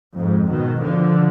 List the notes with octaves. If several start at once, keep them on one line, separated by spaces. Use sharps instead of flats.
F2 G#2
B2 D#3
D3 F3